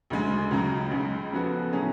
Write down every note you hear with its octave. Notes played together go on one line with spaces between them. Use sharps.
D2 C#3 G#3
C#2 C#3 F#3
C#2 C#3 G#3
C#3 F3 B3 F#4 A4
A2 F#3 C#4 G#4